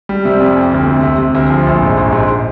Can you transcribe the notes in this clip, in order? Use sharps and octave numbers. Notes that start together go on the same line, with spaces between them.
G3
C3
F2
F2
D2
C3
C3
C3
D2
F3
A#1
G#2
A#1
G#2